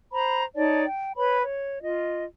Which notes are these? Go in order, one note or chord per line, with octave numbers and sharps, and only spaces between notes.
C5 A#5 B5
D#4 C#5 D5 A5
G5
B4 C#5 B5
C#5
F4 D#5